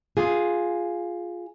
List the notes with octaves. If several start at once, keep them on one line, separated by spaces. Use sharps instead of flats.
F4 G#4